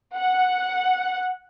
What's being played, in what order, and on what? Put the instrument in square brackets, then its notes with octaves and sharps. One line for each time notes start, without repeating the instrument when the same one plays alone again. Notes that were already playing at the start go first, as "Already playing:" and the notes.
[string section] F#5